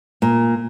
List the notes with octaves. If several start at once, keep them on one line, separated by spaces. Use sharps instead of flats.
A#2